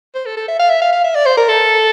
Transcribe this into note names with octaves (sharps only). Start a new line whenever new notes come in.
C5
A4
A4
E5
F5
E5
F5
F5
E5
D5
C5
A#4
A4